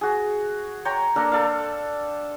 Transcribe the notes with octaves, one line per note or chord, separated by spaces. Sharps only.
F#4 G#4
C#5 G5 A#5 C6
A#3 D4 A4 A#4
A4 D5 F5